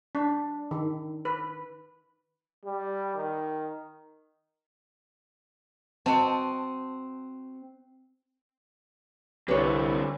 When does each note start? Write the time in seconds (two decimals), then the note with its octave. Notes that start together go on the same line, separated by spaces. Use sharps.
0.15 D4
0.71 D#3
1.25 B4
2.65 G3
3.17 D#3
6.06 C4 F#4 D#5 A5
9.48 C2 D3 C4 B4 C#5